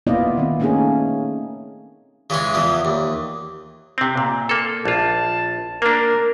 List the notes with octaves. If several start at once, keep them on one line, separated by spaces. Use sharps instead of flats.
A#3 B3 E4 F4 D5 D#5
D#3 C4
A3 A#3 C#4 D#4 G#4
C#3 E3 G#3 C#4
E2 E3 F3
D#2
C3 C4
A#2
A#3 A4
A#1 F4 A5
A#3 D4 A#4